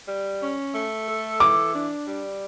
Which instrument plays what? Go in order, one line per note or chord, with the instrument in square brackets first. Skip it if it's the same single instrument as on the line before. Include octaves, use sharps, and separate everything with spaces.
[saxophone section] G3
C#4
A3
A4
[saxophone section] E3 [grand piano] D6
[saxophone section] D4
G3